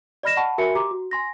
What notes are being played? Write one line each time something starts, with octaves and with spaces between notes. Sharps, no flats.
D5 D#5 B5 F6 A#6 E7
F#5 A5 B5 C#6
F#4 A#4 E5 G#5 B5 C#7
G4 A#5 D6
F#4
G#5 C6 A#6